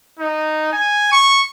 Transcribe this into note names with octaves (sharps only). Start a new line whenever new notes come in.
D#4
G#5
C#6